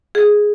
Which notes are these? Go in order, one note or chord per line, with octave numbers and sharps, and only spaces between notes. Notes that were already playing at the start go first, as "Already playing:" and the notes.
G#4